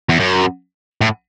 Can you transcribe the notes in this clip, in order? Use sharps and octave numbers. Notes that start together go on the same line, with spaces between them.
E2
F#2
A2